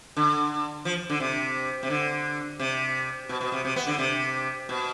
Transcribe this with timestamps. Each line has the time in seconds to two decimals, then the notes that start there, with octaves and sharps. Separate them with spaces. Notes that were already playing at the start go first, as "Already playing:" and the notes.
0.17 D3
0.85 F3
1.10 D3
1.20 C3
1.83 C3
1.90 D3
2.59 C3
3.29 B2
3.41 B2
3.52 C3
3.65 C3
3.76 B3
3.87 D3
3.98 C3
4.69 B2